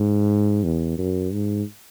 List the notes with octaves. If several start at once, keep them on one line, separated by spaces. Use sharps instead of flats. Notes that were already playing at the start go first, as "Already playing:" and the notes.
Already playing: G#2
E2
F#2
G#2